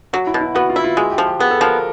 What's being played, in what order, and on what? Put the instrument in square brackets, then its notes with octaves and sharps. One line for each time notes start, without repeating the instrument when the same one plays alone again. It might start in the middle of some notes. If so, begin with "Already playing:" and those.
[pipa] F#3 [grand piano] F#4
[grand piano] E4
[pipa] B2
[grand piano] E4
[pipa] B3 [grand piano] F#4
[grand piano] F4
[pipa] E4
[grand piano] F4
[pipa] G#3 [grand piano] F#4
[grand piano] G4
[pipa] F3
[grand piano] G4
[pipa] B3 [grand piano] G#4
[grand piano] A4
[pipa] F3 [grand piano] A#4